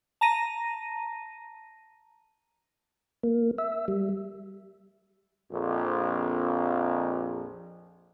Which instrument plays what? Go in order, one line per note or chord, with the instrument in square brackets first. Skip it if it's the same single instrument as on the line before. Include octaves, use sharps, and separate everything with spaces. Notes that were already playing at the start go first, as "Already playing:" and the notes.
[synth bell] A5 A#5 A#6 D#7
[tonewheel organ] A#3
E5
G3
[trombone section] A#1 F2